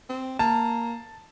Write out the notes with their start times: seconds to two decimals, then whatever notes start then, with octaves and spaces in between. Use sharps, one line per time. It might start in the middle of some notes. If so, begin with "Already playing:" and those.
0.09 C4
0.39 A#3 A5